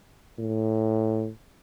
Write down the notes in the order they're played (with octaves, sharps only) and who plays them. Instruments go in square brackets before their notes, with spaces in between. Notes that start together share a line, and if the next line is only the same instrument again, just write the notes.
[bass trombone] A2